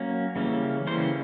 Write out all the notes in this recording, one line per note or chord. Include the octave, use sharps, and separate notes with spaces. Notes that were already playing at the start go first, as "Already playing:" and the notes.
Already playing: F#3 A#3 C#4
C#3 E3 G3 A#3 C#4
C#3 E3 G3 A#3 C#4 C5